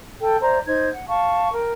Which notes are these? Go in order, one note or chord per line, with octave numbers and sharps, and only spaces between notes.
A4 G5
C5 D5 E5 A#5
D#4 C5 D#5 G#6
F#5
F5 A5 C#6
A#4 G5